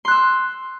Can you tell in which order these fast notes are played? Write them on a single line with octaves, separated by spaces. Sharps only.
C6 F#6 E6